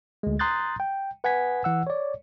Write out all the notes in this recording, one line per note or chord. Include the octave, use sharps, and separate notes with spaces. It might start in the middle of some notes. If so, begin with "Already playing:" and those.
D2 G#3
A#5 C6 D#6 F#6 G6 A6
G5
B4 F#5 G#5 G#6 B6
E3 F#5 E6
C#5 D5